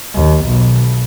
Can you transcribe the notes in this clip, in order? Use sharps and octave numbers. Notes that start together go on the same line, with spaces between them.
D#2
B1